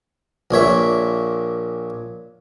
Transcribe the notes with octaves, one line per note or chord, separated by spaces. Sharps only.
A#1 A#2 C#5 E5